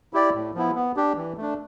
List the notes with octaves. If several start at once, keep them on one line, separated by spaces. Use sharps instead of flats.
E4 G4 D5
A2
F3 B3 E4
B3
D4 G4
E3
A3 D4